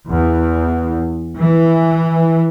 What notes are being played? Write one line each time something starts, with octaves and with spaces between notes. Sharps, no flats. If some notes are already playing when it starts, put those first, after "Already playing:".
E2
E3